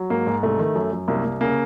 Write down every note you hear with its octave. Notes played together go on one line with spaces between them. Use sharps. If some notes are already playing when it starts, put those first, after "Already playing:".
Already playing: F#3
G#2 A#3
G#2
C2 A3
D#3
F#2
F#2
C2 A#3
C2
C#3 A#3